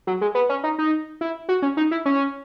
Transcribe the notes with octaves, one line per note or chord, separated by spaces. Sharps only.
F#3
G#3
B3
C#4
D#4
D#4
E4
F#4
C#4
D#4
E4
C#4